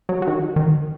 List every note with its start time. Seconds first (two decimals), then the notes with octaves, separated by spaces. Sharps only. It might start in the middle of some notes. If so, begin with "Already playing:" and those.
0.09 F#3
0.22 F#3
0.27 D#3
0.56 D#3